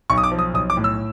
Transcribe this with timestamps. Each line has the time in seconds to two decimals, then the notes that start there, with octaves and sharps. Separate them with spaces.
0.10 B1 C#6
0.18 D#6
0.24 D6
0.32 F3
0.39 D#6
0.54 B1 D#6
0.70 D6
0.77 A2
0.84 E6